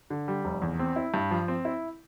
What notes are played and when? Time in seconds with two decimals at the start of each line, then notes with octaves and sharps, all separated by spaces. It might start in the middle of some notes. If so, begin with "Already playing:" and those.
0.10 D3
0.28 G3
0.45 F1
0.62 E2
0.79 C4
0.96 E4
1.14 G2
1.31 F3
1.48 C4
1.65 E4